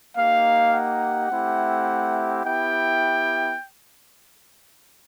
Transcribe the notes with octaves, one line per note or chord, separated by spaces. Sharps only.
A#3 D#4 G4 F5
F#5
A3 C4 E4 G4
B3 E4 G4 G5